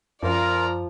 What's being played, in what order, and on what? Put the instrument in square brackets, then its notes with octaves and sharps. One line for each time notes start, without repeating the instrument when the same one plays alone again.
[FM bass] F#2 [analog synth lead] F3 [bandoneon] F4 A#4 [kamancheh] D5 A#5